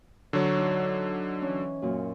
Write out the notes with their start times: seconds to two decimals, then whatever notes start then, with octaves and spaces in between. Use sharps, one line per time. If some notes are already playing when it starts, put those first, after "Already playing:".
0.33 D3 F#3 C#5
0.57 D#4
1.42 E3 C#4
1.82 F#2 A#2